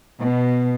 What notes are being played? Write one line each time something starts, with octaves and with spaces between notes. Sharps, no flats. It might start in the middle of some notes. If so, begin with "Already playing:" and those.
B2